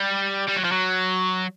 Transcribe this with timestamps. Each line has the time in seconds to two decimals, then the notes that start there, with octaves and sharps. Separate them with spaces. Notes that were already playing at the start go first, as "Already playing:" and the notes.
Already playing: G3
0.48 G3
0.57 F#3
0.65 F3
0.72 F#3